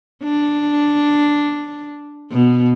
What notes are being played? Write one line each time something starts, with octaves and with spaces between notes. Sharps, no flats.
D4
B2